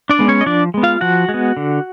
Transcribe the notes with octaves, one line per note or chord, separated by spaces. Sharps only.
D4 D5
G#3 B3
C#4 C#5
D#5
F3 D4 D5
G#3 B3
F4 F5
F3 F#4 F#5
G#3
B3
D3